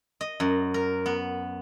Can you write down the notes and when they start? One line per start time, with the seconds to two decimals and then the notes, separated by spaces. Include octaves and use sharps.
0.21 D#5
0.40 F#2
0.74 A#4
1.06 B3